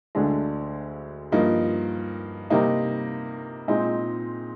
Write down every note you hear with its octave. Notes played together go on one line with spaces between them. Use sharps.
D2 D3 G#3 D4
G2 F3 A#3 D#4
C3 G3 A#3 D#4
A#2 G#3 C4 D#4